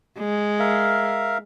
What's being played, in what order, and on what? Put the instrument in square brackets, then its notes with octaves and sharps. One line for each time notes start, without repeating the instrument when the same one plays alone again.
[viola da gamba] G#3
[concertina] A#4 E5 F5